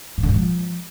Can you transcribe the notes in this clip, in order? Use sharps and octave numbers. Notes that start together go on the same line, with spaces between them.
A2
D3
G#2
F3